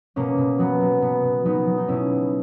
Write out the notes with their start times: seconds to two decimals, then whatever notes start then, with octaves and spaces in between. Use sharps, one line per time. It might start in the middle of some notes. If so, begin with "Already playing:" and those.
0.16 B2 A#3 C#4
0.38 B2
0.59 F#3 B3
0.80 F#3
1.01 B2 B3
1.24 B2
1.45 F#3 B3 D#4
1.67 F#3
1.77 D#4
1.88 B2 C#4 E4
2.10 B2